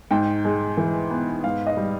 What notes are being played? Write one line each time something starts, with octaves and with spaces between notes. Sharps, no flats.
G#2 G5
G#3
E3
B3
G#2 F5
D#5
G3